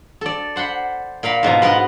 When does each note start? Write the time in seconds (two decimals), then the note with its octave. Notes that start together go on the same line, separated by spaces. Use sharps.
0.21 A4 D5
0.56 C5 F#5 B5 C6
1.23 A#2 A#4 F5 B5
1.43 G#2 B2 F3 A#5
1.62 B3 A#4 B4 D#5 F#5